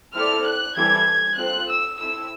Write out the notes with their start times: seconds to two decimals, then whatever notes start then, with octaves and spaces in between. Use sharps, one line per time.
0.14 C4 E4 A4 D5 F6
0.45 F#6
0.76 E3 G3 C4 E4 A4 G#6
1.37 C4 F4 A4 C5 F#6
1.69 E6
1.99 C4 E4 A4 E6